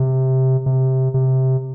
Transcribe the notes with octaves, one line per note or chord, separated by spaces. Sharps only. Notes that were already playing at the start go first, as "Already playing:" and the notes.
Already playing: C3
C3
C3